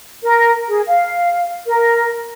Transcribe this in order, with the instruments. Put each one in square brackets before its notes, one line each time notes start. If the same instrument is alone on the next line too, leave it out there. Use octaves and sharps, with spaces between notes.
[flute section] A#4
G#4
F5
A#4